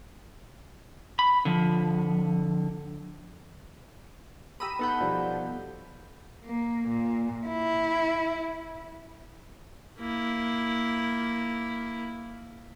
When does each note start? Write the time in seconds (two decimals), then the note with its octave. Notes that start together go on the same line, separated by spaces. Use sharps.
1.19 B5
1.45 D3 F3
4.60 G4 A#5 B5 D#6 E6 D#7
4.79 B3 D#4 A4 F#5 B5 G6
5.01 B2 F3 G3
6.44 A#3
6.89 A#2
7.47 E4
9.99 A#3 E4